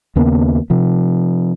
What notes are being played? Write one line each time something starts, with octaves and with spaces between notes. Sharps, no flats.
D#2 C#3 A#3 B3
C3 F3